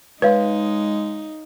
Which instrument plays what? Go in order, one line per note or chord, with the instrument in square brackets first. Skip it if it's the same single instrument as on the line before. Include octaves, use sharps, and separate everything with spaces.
[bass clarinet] G#3 [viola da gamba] D#4 [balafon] B4 [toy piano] C#5 F5